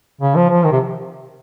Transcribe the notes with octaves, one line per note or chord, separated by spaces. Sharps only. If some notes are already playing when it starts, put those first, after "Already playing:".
C#3
F3
F3
D#3
C3